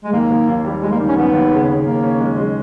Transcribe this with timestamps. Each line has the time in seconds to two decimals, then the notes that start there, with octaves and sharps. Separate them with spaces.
0.04 G#3
0.13 D#2 A#3
0.30 D#2
0.48 D#2
0.65 G3
0.82 G3 G#3
0.91 A#3
0.99 D#3
1.08 C#4
1.16 D#2 B3
1.33 D#2
1.51 C#3
1.68 C#3
1.85 D#2 A#3
2.03 C#4
2.20 G#3
2.37 G#3